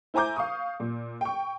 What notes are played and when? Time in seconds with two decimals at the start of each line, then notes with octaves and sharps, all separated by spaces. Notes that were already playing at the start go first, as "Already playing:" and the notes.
0.14 E4 C5 G#5 A#5 D6 G6
0.36 F5 C#6 D#6
0.80 A#2
1.21 G5 C#6